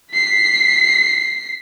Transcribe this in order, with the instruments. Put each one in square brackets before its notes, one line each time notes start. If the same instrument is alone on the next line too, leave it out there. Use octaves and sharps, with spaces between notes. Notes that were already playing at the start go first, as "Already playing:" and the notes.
[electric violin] B6 C7